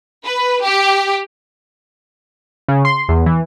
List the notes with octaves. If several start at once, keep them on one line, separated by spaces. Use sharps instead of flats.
B4
G4
C#3
C6
E2
E3